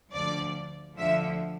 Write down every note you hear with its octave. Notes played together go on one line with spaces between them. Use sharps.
D2 D3 F3 D5
D2 D3 F3 E5